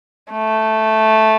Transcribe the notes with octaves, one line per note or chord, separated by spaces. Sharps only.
A3